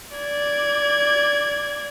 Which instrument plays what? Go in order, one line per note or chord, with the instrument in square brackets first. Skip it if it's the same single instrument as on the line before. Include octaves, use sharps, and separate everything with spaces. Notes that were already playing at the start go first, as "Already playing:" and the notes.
[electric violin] D5 G#6